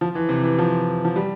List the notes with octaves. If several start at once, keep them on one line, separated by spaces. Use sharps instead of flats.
F3
E3
C3
E3
F3
F3
G3